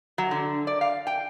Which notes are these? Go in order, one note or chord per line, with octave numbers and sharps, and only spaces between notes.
F#3
D3
D5
F5
G5